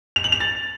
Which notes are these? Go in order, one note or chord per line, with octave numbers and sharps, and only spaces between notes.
F7
F#7
F7
A6